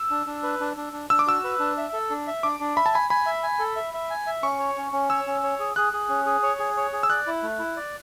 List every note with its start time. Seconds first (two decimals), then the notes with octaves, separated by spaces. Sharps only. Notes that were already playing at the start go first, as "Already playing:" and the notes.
Already playing: E6
0.11 D4
0.27 D4
0.43 B4
0.60 D4
0.77 D4
0.93 D4
1.10 D4 E6
1.19 D6
1.27 F#4 E6
1.44 B4
1.60 D4
1.77 E5
1.93 A4
2.10 D4
2.27 E5
2.43 D4 D6
2.60 D4
2.76 E5 B5
2.86 A5
2.93 G#5 B5
3.10 G#5 B5
3.26 E5
3.43 G#5
3.59 A4
3.76 E5
3.94 E5
4.10 G#5
4.27 E5
4.43 C#4 C#6
4.59 C#5
4.77 C#4
4.93 C#4
5.10 C#5 E6
5.27 C#4
5.43 C#5
5.59 G#4
5.76 G#4 F#6
5.93 G#4
6.09 C#4
6.26 G#4
6.43 C#5
6.59 G#4
6.77 C#5
6.93 G#4
7.03 E6
7.10 D5 F#6
7.27 E4
7.43 A3
7.59 E4
7.77 D5